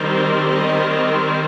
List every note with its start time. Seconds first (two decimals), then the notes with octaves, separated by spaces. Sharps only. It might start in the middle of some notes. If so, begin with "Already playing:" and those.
Already playing: D#3 G3 C4
0.51 D#5